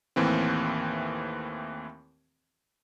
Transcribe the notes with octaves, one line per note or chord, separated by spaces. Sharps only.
D#2 A2 E3 C4